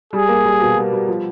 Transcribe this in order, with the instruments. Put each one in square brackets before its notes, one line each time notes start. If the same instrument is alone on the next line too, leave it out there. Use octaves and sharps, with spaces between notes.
[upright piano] G3 [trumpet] G#4
[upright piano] A#3
G3
B2
G3
G3
F3